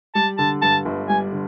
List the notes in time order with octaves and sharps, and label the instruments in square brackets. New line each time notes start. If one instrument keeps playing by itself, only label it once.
[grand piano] G3 [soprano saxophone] A5
[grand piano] D3 [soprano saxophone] A5
[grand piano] G2 [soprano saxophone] A5
[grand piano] G1
[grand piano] G3 [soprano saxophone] G#5
[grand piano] D3